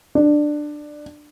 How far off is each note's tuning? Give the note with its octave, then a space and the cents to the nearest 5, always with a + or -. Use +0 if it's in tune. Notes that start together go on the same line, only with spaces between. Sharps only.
D4 +15